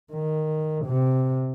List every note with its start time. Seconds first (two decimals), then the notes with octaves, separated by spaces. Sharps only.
0.13 D#3
0.86 C3